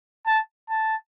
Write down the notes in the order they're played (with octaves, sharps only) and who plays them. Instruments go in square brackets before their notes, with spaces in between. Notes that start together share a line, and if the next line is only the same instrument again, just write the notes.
[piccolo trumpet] A5
A5